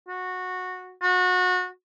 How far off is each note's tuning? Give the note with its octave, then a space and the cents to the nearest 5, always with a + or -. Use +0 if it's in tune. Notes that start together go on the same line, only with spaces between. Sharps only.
F#4 -15
F#4 -25